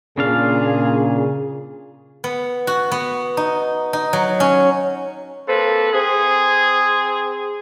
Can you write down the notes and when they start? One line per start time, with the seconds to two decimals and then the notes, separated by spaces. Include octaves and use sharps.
0.18 A#2 C#3 D4 G#4 F5
2.24 B3
2.67 F#4
2.92 B3
3.37 D#4
3.93 D#4
4.13 F#3
4.40 C#4
5.48 A#3 C4 A4 B4
5.93 C4 G#4